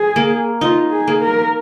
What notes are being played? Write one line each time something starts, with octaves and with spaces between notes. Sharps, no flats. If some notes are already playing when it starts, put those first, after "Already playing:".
Already playing: G#4
A#3
D#4 F4
G#4
A#3
A#4